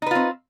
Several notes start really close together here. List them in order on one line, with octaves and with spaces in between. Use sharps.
D#4 B4 F4 C4